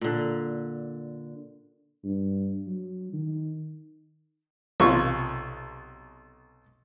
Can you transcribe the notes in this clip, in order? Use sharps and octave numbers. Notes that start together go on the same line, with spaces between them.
A#2 D3
G2
F#3
D#3
B1 C3 F4 C#6